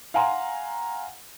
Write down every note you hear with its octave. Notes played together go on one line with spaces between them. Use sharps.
F5 F#5 G#5 A#5 C6